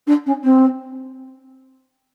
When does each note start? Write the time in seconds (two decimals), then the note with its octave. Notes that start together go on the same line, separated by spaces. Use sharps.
0.07 D4
0.26 C#4
0.43 C4